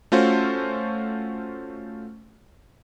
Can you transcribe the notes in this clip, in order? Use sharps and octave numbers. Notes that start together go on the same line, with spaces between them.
A3 C#4 F4 F#4 C5